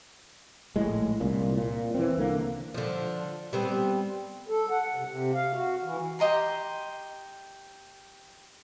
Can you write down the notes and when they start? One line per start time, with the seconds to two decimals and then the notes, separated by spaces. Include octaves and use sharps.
0.76 A#1 A2 G#3
1.20 C2 A#2
1.57 A#2
1.94 E3 C4
2.17 C2 D3 A#3
2.74 D3 F3
3.53 G3 B3 C4
4.48 A4
4.70 F#5
4.95 C3
5.07 C3
5.34 F5
5.54 F#4
5.84 E3
6.19 G4 D#5 A#5 C6